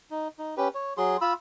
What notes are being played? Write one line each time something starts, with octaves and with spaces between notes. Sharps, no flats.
D#4
D#4
C#4 G4 B4
C#5
F#3 G#4 C6
F4 B5 E6